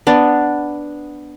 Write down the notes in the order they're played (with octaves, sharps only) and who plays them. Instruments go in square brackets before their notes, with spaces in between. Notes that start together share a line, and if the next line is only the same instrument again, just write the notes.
[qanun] B3 D4